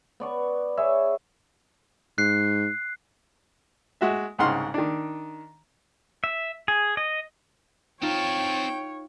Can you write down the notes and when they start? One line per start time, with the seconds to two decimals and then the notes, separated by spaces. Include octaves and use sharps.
0.20 B3 D5 C#6
0.77 G#4 C#5 E5
2.18 G#2 F#6 C7
4.01 G#3 F#4 E5
4.39 C2 G#2 C#3 F#5 C6 F6
4.74 D#3 D4
6.24 E5
6.68 G#4
6.97 D#5
8.03 C4 D#4 F4 C#5 G5 A5